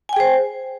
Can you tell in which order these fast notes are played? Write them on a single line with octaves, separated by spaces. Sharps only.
G#5 G5 G#4 C5